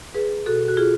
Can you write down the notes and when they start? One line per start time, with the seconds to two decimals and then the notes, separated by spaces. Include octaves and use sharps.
0.15 G#4 B4
0.46 B2 F#4 A4
0.68 F#4
0.77 F4 G#4